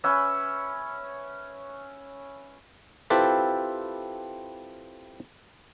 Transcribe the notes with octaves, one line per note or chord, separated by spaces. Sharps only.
C#4 B4 E5
C4 E4 F4 G4 A4 B4